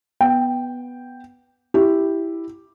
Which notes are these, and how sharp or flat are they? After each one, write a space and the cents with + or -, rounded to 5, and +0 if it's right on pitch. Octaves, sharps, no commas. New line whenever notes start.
B3 +0 G5 +0
E4 +0 G4 +0